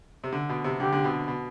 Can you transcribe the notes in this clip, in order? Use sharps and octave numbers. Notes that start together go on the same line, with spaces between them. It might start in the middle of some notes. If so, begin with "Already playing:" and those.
C3
D3
B2
C3
D3 G4
D3
B2
B2